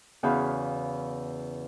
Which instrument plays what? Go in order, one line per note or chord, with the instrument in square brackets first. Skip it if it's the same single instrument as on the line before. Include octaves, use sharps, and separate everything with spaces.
[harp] E2 C#3 F#4 F5 B5 G6